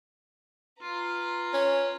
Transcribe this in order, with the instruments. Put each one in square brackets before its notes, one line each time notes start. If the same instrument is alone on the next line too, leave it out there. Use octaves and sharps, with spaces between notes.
[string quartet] F4 B4 A#5
[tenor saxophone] C#4